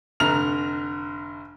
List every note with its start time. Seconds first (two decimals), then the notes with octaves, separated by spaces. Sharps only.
0.20 F1 D3 A#5 F6 F7